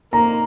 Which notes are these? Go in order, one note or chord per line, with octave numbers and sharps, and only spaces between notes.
A#3 A#5